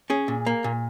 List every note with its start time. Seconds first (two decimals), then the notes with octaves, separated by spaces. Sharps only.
0.10 C#4 G#4
0.28 A#2
0.46 A#3
0.64 A#2